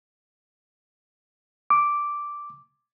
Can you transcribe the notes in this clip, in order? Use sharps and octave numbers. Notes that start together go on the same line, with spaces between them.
D6